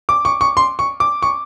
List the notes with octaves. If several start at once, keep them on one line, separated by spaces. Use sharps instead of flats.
D6
C#6
C#6
C6
C#6
D6
C#6